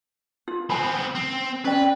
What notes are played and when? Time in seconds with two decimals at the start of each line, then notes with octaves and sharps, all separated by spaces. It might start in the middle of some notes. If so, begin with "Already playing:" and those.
0.48 F4
0.70 B3 C4 G#5 B5
1.15 C4
1.65 C#4 B4 D5 G5